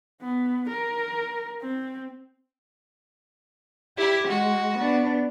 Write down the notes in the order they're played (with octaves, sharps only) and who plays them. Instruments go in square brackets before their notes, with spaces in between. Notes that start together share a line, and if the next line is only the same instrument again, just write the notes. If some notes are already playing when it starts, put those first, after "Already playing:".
[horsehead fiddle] B3
A#4
C4
[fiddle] E4 [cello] G4
[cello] G#3 [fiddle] F#4
[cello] B3 D4